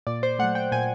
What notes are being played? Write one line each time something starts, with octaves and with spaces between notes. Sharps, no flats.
A#2 D5
C5
F#3 A3 F#5
G5
A#2 G#5